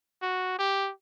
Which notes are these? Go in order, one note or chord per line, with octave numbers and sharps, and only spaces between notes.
F#4
G4